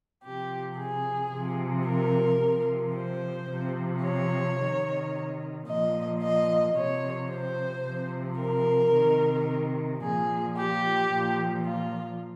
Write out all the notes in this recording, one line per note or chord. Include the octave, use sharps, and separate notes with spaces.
C3 F3 G4
G#4
C3 F3
A#4
C3 F3
C5
C3 F3
C#5
C3 D#3
A#2 F3 D#5
D#5
C3 F3 C#5
C5
C3 F3
A#4
C3 D#3
A#2 F3 G#4
G4
A#2 F3
F4